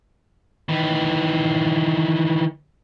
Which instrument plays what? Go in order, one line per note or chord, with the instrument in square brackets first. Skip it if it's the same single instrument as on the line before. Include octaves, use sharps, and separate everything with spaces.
[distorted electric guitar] D#3 E3